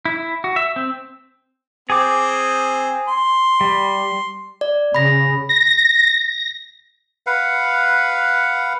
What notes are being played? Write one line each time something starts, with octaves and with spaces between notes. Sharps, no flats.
E4
F#4
E5
C4
C4 G#4 D6
C6
G3
D5
C#3 B5 A#6
A#6
B4 F5 F#5